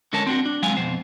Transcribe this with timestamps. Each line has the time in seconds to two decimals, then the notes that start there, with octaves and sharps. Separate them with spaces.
0.13 D3 G#3 C#4 A#4 C#5 A5
0.27 C4 D4 F#4
0.46 D4
0.62 D#2 F#3 G#3 C4 F5 G#5
0.77 F2 B2 C5